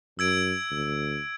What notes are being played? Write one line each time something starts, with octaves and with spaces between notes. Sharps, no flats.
F#2 E6 G#6 D7
D2